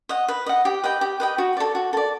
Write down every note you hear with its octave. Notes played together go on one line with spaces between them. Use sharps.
D#5 F#5
B4
D#5 F#5
G4
B4 D#5 G5
G4
B4 D#5 G5
F#4
A4 D5
F#4
A4 D5